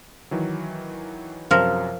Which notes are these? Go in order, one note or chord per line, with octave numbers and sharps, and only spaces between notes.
D#3 E3 F#3
F#2 C3 F3 F#3 A#4